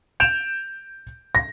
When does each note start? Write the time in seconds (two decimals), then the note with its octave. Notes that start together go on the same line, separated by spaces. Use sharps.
0.20 G6 D7 E7 F7
1.35 A#6